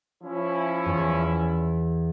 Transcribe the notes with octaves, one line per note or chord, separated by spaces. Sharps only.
F3 C#4 E4
E2